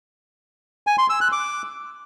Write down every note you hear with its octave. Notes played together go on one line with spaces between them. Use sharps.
G#5
C6
E6
F#6
D6